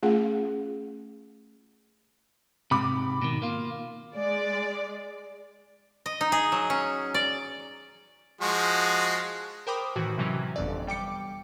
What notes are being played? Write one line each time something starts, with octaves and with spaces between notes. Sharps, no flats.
A3 C#4 F4 G#4 F5 F#5
G#2 C3 B5 D6
B2 D#3
A#3 F4
G#3 D5
D#5
D#4
G#4
F#3
C#4
D5
F3 G#3 F#4
A#4 C5 G5 B5 D6 D#6
A2 D#3 E3 F#4
C3 E3 F#3 C#4
G1 F2 D5
G3 G5 D6 C#7